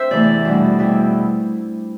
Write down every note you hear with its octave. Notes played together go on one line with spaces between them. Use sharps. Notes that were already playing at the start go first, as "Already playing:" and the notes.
Already playing: C4 D4 C5 E5
E2 C3 E3 A3 E4 D5
E2 B2 G3 D4
B2 G3 C4 E4